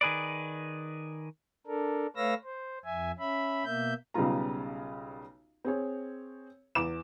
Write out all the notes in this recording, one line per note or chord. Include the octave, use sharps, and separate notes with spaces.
D#3 G#4 B4 D5
D4 A4 A#4
A3 B4 C#5 F5 E6 A#6
C5
F2 E5 G#5
C#4 E5 B5
B2 A#3 E5 G6
B1 C#3 G3 B3 F4 A#5
C4 G#4 C#5
E2 D6 E7